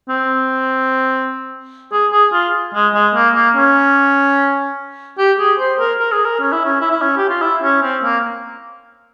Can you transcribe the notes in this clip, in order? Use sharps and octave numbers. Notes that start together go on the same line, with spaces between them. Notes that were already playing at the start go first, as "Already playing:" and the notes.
C4
G#4
G#4
F4
G#3
G#3
A#3
A#3
C#4
G4
G#4
C5
A#4
A#4
G#4
A#4
C#4
E4
C#4
E4
E4
C#4
G4
F4
E4
C#4
C4
A#3